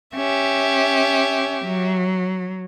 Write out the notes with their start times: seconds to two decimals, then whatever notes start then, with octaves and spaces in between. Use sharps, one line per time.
0.15 C#4 G4 E5
1.65 F#3